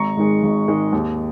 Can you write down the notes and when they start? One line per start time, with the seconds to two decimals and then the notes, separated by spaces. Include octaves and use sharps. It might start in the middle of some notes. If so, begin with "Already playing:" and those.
Already playing: G#1 A#5 C#6
0.17 G#2 D#3 G#3
0.43 G#1
0.68 G#2 D#3 G#3
0.92 D#2